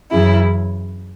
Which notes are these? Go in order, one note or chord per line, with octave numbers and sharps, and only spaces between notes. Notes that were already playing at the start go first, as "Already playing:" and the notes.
F#2 C#3 E3 E4